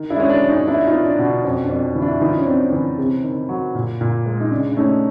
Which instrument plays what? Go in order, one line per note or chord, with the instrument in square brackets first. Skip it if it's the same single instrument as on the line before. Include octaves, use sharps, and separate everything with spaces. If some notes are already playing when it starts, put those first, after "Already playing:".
Already playing: [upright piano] D#3
[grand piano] D4 E4
[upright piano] G#3 [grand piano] C#4
[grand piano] D4
[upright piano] F#2
[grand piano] C#4 D#4
[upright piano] B3 [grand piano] D4 E4
[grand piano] D#4 F4
[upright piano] B3
[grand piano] D4
[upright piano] B2
[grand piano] D4
[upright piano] F2 [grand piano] C#4
[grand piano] D4
[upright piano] F2
E3
[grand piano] D4 E4
[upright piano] E3 [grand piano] D#4 F4
[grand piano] C#4
[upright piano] C4 [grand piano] D4
[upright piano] E3 [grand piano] C#4
[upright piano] C3
D#3
F#3
A#2
A#2
G#3
[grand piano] D#4
[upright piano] C#3 [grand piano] D4
[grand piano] D4
[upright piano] A3 [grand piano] C#4 D#4